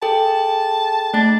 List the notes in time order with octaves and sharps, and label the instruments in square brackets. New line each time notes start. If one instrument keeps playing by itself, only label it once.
[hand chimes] G#4 A4 G5 [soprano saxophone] A5
[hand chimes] A3 A6 [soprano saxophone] D4